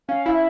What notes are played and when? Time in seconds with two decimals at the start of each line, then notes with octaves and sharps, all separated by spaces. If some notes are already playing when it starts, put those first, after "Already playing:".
0.09 C#4 F5
0.26 E4
0.34 E5